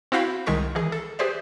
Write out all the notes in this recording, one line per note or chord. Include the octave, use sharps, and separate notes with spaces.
C4 E4 F#4 F5 G5 B5
C2 D#3 G#3 A#4 C#6 B6
D#3 E3 G#4
A4
G4 G#4 B4 C5 D5 E5